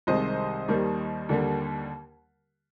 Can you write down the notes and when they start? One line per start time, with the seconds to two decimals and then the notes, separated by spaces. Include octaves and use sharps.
0.07 C2 C3 D#3 G#3 C5 D#5
0.68 D#2 D#3 G3 A#3
1.29 D#2 D3 G3 A#3